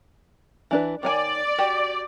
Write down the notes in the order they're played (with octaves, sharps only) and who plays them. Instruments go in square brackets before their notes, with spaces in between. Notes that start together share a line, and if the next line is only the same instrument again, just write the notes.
[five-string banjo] E3 D4 B4
[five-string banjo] D#3 C#5 G#5 [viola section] D5
[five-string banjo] F#4 G4